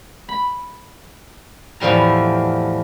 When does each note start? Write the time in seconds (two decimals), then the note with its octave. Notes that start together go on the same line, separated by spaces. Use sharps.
0.29 B5
1.80 E2 A2 F3 G3 A#5